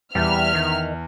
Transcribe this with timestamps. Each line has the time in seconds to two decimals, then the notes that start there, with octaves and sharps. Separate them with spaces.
0.15 E2 G3 E5 F6
0.55 D#3